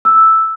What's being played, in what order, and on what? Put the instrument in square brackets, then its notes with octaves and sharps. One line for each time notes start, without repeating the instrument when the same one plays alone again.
[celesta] E6